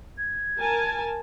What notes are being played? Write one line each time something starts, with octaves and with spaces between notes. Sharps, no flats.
G#6
A#4 G#5 A5